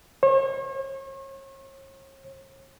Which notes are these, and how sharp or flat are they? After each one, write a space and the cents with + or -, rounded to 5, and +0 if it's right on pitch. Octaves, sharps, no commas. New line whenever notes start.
C#5 -40